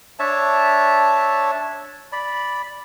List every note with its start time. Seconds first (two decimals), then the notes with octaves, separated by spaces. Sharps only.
0.19 D4 C#5 E5 A5
2.12 D5 B5